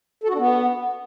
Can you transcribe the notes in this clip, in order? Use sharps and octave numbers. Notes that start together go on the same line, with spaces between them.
A4
F#4
D4
B3